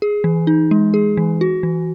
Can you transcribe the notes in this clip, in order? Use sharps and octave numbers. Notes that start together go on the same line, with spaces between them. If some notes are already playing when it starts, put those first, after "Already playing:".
G#4
E3
D#4
G#3
G#4
E3
F#4
E3